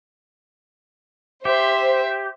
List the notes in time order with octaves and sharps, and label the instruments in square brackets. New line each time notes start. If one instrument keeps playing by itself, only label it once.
[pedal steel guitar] G4 [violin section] C5 [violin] E5